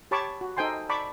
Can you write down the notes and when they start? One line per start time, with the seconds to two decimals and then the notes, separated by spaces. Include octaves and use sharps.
0.11 G4 C#5 A5 B5 C#6 D6
0.41 F#4
0.57 D#4 A4 C5 G5 G#5 C6
0.89 D5 A5 B5 C#6 D6